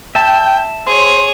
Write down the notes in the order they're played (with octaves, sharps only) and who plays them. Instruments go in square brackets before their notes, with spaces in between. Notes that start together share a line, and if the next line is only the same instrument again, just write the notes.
[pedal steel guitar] E5 A5 [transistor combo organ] G5
[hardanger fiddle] G#4 C#5 [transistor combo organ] C5